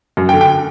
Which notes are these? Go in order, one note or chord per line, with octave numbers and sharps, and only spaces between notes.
F#2
G5
D3
G5